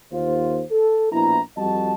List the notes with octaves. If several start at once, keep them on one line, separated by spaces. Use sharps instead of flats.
D#2 F4 C5
A4
A#1 B2 E4 A#5
F2 G3 F#4 D#5 A5